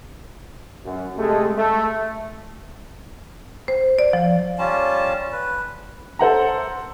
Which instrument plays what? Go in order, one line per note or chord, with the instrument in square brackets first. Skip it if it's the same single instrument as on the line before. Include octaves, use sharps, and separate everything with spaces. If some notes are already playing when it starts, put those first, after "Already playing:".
[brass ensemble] F#2
C3 G#3 A3
A3
[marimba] C5
D5
F3
[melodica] G3 C#4 F4 A5
B4
[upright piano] A4 C5 F#5 A#5